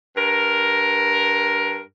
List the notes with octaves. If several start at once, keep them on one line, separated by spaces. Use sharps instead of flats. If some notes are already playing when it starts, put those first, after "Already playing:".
G2 A#4